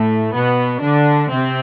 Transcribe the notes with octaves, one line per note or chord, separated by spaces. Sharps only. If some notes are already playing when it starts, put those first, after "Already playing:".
Already playing: A2 A3
B2 B3
D3 D4
C3 C4